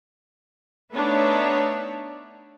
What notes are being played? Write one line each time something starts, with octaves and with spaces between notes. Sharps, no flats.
A3 B3 D4 D#4 C#5 E5